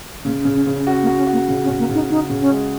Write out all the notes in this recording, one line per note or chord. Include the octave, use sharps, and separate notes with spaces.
C#3 A#3
C#4
C#3
C#4
C#3
C#4
C#4 F#4
A#3
F#4
C#4
F#4
A#3
C#3 C#4
C#4
C#3
A#3
C#3
D#4
C#3 D#4
C#3
C#4
G#3